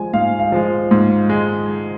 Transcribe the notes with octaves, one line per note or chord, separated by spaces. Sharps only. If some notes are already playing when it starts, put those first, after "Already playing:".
Already playing: F3 G#3 G#5
G#2 F5
F5
F3 G#3
G#2
G#3